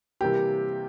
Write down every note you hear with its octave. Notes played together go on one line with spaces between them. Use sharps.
C3 E3 G3 A#3 G4